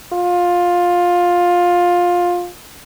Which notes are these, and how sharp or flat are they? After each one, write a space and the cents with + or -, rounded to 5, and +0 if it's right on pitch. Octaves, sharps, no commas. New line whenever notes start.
F4 +15